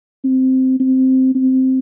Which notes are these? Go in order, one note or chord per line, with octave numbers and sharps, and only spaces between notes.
C4
C4
C4